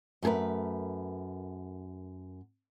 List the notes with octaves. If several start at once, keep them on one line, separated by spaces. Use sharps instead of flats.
F#2 A3 G#4 A#4 B4